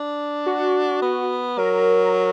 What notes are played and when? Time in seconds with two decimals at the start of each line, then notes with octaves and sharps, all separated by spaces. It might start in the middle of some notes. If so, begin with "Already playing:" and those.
Already playing: D4
0.46 F#4
1.02 B3
1.58 F#3 A#4